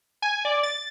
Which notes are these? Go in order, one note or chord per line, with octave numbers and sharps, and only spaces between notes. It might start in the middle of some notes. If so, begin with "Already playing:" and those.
G#5
D5
A6